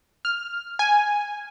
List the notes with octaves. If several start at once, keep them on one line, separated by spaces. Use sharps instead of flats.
F6
G#5